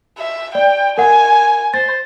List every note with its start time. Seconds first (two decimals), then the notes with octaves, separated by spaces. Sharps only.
0.18 E5
0.55 D5 G5
0.98 A#4 F#5 G#5
1.74 C5 A6